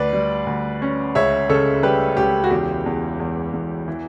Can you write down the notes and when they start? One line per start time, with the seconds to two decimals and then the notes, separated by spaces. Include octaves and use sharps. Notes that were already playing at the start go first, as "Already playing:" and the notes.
Already playing: D2 B4 D5
0.13 G3
0.47 D2
0.82 C#4
1.15 C#2 C#5 E5
1.49 C#3 A4 C#5
1.83 G3 G4 B4
2.17 C#2 G4
2.44 F#4
2.51 E2 G4
2.86 E2
3.20 E2
3.53 E2
3.88 E3